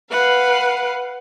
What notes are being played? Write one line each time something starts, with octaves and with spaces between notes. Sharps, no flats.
B4 F5 F#5